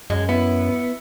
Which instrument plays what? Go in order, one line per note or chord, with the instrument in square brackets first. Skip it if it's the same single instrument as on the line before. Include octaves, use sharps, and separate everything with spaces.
[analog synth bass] F#2 [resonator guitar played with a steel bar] G#3
[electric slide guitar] B3 [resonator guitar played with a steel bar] E4